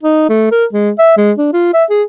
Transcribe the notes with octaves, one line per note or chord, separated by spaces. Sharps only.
D#4
A3
A#4
G#3
E5
G#3
D4
F4
E5
G#4